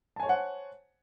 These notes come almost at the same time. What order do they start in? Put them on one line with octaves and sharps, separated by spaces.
A5 G#5 C#5 C5 F#5